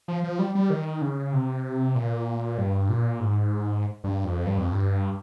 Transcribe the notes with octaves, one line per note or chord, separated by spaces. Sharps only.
F3
F3
G3
G3
D#3
C#3
C3
A#2
G2
A#2
G#2
G2
F2
G2
F2
G2